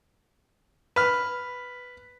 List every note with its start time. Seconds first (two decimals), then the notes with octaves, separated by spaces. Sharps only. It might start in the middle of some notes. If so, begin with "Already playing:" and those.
0.96 B4 F6